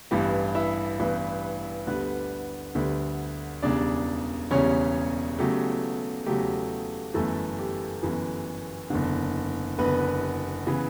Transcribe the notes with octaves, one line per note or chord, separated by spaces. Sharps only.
A1 G2 E3 B3 G4
E4 E5
A1 G2 E3 B3
D2 D3 G3 B3 B4
D2 D3 G3 B3
E1 E2 C#3 G3 D4 D5
E1 E2 C#3 G3 C#4 C#5
E2 C#3 F#3 A3 G4
E2 C#3 F#3 A3 G4
G1 F#2 E3 A3 A4
G4
G1 F#2 E3
F#1 E2 D3
F#1 E2 D3 B3 B4
C#3 E3 B3